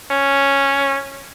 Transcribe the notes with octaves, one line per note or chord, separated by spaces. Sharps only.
C#4